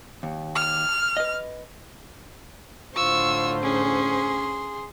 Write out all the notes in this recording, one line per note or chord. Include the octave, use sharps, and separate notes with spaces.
D#2
F6
B4 D#5
A2 D3 F4 C5 C#6 E6
C#4 G#4 C6